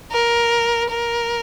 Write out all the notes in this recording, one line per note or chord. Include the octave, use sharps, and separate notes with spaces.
A#4
A#4